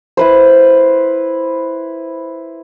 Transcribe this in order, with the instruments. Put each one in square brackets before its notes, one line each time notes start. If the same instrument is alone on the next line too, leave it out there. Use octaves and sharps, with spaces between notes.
[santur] E4 B4 C5